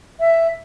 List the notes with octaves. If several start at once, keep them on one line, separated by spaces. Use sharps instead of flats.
E5